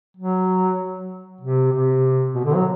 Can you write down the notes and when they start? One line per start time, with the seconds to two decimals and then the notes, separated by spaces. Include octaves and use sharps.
0.17 F#3
1.41 C3
1.72 C3
2.34 B2
2.44 D3
2.55 F#3